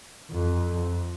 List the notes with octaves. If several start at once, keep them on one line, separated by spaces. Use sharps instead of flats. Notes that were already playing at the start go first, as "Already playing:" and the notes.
F2